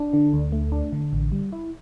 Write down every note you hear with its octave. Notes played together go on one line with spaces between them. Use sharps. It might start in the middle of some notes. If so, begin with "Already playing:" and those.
Already playing: D4
D3
D2
A3
D4
D3
A1
G3
E4